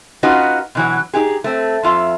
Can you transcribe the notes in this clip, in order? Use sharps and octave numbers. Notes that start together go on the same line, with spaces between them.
C#4 D#4 F4 F#4 B4 D#5
B2 E3 F#3
D#4 G4 G#4
A3 C4
F2 F4 E5